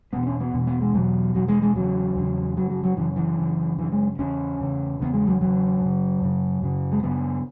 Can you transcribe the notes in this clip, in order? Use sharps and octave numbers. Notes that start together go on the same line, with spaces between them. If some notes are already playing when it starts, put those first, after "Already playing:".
E2 B2 B3
C#4
B3
E2 B2
B3
G#3
E2 B2 F#3
E2 B2 F#3
G#3
G#3
E2 C#3 F#3
E2 C#3
F#2 C#3 F#3
F#3
F#3
F#2 C#3 E3
E3
F#2 C#3
F#2 C#3 E3
G#3
E2 C#3 C#4
E2 C#3
E2 C#3 B3
G#3
F#3
E2 C#3 F#3
F#2 C#3
F#2 C#3
F#2 C#3
G#3
F#2 C#3 B3